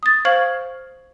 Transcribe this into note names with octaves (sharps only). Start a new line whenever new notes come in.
D#6 A6
C5 F5 C#6 F6 G#6 F#7